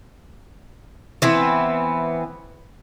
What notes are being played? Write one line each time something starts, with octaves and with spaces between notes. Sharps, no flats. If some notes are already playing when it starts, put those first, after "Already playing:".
E3 B3 C4